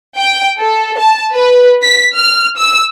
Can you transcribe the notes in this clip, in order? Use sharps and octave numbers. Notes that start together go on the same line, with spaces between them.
G5
A4
A5
B4
B6
F6
E6